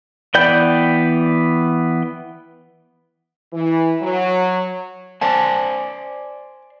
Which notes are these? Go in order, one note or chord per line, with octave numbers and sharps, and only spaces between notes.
E3 B3 D5 G5 G6
E3
F#3
C5 D5 G#5 A5